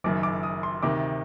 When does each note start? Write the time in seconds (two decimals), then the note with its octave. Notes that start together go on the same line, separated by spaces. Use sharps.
0.04 F#1 F#2 D#3 D6
0.23 D6
0.43 D#6
0.63 C6
0.82 D2 C3 D#3 D6